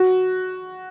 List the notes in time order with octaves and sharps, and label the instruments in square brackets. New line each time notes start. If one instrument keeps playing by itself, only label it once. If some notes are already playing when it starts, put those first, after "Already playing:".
Already playing: [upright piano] F#4